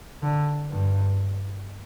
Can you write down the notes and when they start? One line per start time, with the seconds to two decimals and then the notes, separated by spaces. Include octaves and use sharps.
0.22 D3
0.70 G2